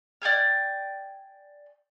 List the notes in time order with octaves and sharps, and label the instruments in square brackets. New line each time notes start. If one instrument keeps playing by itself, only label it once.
[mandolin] D5 G5 G#5 F6